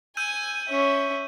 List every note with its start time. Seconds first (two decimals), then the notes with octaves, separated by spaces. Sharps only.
0.17 G#5 E6 G6 D#7
0.69 C#4 E5